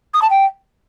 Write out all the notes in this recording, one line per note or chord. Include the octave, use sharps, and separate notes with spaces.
D#6
A5
G5